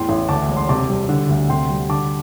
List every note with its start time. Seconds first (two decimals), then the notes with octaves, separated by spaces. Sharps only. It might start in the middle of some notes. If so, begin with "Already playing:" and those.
Already playing: E2 A2 G5 C6
0.09 A1
0.29 D2 A5 D6
0.49 E1
0.57 C6
0.69 C3 A5 D6
0.89 G3
1.09 D3
1.29 D2
1.49 C3 G5 C6
1.69 G3
1.89 D3 A5 D6